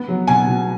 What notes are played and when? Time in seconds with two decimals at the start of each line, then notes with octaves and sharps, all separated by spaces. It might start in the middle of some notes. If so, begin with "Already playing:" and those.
Already playing: B3
0.08 F#3
0.27 B2 G#5
0.47 B2